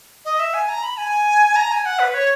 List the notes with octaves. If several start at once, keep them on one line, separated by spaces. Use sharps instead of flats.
D#5
E5
G#5
A#5
B5
G#5
A#5
G#5
F#5
B4
C#5